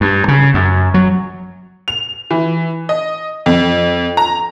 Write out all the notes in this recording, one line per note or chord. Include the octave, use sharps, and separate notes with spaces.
G2
C#3
F#2
F#3
F7
E3
D#5
F2
A#5